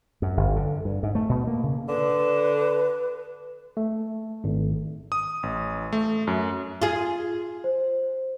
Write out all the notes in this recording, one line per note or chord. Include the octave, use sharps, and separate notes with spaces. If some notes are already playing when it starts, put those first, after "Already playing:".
F#2
G1
D3
G2
G#2
A3
B2
A#3
C#3
D3 B4
A3
G#1
D#6
A1
A3
F#2
F4 G#4
C5